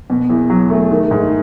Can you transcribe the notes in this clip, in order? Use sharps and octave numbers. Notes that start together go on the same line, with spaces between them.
B2
E2
F#3
A3
D#3
G#2